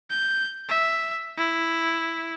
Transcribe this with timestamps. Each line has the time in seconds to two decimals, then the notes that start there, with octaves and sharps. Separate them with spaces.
0.11 G6
0.69 E5
1.37 E4